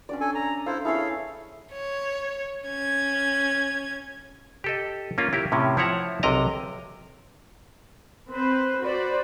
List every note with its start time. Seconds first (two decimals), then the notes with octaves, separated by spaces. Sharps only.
0.09 C#4 D4 D5
0.21 A4 G#5
0.35 A#5
0.66 E4 A4 C5 F5
0.85 E4 G#4 A4 C#5 F5
1.72 C#5
2.65 C#4 G#6
4.64 G4 A4 D#5
5.18 A#3 C#4 F4
5.33 E4 G4 A#4
5.52 A2 C3 C#4
5.77 F3 E4 C#5 E5 F#5 A#5
6.23 B1 C3 A#4 D#5 A#5
8.31 C4 B4 C5
8.82 F#4 B4 C5 D5